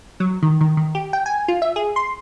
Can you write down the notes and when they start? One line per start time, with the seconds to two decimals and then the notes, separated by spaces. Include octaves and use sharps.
0.20 F#3
0.43 D#3
0.61 D#3
0.77 D#3
0.95 G4
1.13 G5
1.26 G#5
1.48 F4
1.62 E5
1.76 G#4
1.96 C6